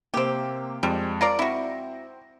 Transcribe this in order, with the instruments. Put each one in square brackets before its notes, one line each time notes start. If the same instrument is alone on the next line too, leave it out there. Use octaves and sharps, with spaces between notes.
[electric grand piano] C3 A#3 [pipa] C4 G4
[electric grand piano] F2 G#3 [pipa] G3
[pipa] F4 A#4 D5 [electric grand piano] A#6
[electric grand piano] C4 [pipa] E4 F#4